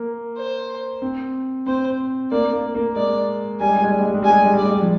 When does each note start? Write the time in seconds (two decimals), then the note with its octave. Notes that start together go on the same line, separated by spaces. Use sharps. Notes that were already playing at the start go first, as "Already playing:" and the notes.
Already playing: A#3
0.37 C5
1.02 C4
1.66 C4 C5
2.31 A#3 D5
2.53 A#3
2.75 A#3
2.96 G#3 D5
3.60 G3 G#5
3.68 G#3
3.76 G3
3.83 G#3
3.91 G3
3.99 G#3
4.07 G3
4.14 G#3
4.22 G3 G#5
4.30 G#3
4.38 G3
4.45 G#3
4.53 G3
4.57 G#3 D5
4.69 G3
4.82 F3